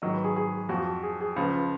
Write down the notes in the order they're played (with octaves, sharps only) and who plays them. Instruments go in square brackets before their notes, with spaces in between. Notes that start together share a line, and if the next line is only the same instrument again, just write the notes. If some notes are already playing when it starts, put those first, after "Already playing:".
[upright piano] G#2 D#3 F#3 D#5
B4
G#4
G#4
F2 F3 F#4
G#4
G#4
C#2 C#3 F3 B4